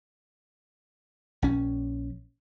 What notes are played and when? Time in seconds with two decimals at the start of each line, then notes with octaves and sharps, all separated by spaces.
1.42 A#1 C#4